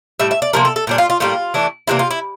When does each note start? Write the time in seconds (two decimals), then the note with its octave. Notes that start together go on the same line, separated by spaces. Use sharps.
0.19 A2 G3 E5
0.31 E5
0.42 D5
0.53 C3 F3 A#3 A#4
0.65 A4
0.76 A4
0.87 A#2 G3 D4
0.98 F4
1.10 F4
1.20 A2 G3 A#3 F4
1.54 E3 A3 D4
1.87 C3 E3 A#3 D4 E4
1.99 F4
2.11 E4